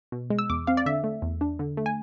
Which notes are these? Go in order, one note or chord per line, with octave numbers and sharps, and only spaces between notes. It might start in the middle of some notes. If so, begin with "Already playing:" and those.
B2
G#3
E6
E2 D6
C4 F5
D5
D3 E5
A3
E2
D4
D3
A3
G#5